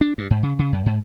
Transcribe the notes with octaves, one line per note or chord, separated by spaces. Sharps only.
D4
G2
G#2
C#3
C#3
F#2
G#2